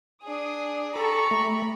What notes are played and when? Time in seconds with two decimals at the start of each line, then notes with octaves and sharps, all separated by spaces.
0.23 D4 G#4 D#6
0.96 G4 A4 A#5 B5 C#6
1.31 A3